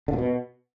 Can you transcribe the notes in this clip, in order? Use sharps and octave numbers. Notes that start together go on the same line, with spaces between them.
D3
A#2
B2